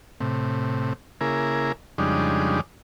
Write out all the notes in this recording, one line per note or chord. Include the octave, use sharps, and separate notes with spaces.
A2 C3
C#3 A#3 E4 G#4 A#4
F2 C#3 G3 G#3 D4 D#4